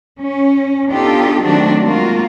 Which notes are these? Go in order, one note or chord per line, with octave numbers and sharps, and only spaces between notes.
C#4
B3 D4 D#4 F4 G4 A4
D#3 F#3 A3 C4 D4 F#4
G#3 A#3 F4 F#4 A#4